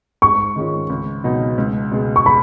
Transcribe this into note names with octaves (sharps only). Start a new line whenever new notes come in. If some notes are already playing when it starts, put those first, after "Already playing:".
G#2 C#6
D#3 G#3 C#4 F4
C#2
B2 F#3 B3 D#4
C#2
B2 G#3
C#6
B5